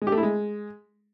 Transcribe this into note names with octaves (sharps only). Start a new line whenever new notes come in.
G#3
G4
A3
E4
G#3